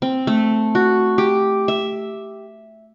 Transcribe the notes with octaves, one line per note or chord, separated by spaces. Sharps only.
C4
A3
F#4
G4
E5